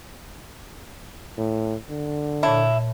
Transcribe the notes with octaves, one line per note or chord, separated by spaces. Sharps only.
A2
D3
A#2 E4 C#5 A5